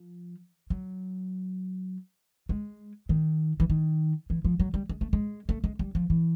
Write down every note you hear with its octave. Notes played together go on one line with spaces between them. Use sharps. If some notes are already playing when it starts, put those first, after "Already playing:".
Already playing: F3
F#3
G#3
D#3
E3
D#3
E3
F3
F#3
G3
G#3
A3
G#3
A3
G#3
G3
F3
E3